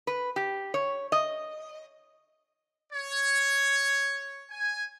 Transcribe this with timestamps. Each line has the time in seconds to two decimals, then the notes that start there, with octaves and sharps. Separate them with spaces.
0.07 B4
0.36 G4
0.74 C#5
1.12 D#5
2.93 C#5
4.50 G#5